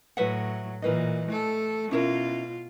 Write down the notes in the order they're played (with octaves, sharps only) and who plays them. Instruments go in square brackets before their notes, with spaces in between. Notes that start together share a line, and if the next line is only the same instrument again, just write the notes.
[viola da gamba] A2 F#3 [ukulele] B4 E5 F#5
[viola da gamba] A#2 E3 [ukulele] A#4 B4 D#5
[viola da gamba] A3 A4
[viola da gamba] B2 F4 [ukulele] C#4 E4 A#4